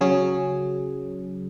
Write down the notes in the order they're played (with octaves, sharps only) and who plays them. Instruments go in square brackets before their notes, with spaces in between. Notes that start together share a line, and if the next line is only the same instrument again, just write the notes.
[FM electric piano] C#3 F#3 C#4 G#4